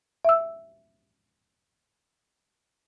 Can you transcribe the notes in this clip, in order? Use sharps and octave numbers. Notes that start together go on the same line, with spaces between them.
E5 E6